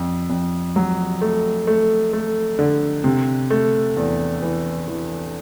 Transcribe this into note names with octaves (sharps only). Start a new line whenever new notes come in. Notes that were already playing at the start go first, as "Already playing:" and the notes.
Already playing: F2
F2
F#3
A3
A3
A3
D3
C3
A3
E2
E3
E3